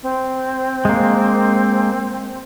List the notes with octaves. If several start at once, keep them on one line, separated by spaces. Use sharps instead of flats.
C4
G#3 A#3